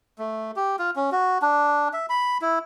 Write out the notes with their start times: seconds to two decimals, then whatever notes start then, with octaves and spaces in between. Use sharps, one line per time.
0.18 A3
0.56 G4
0.79 F4
0.96 C#4
1.12 F#4
1.42 D4
1.93 E5
2.09 B5
2.42 E4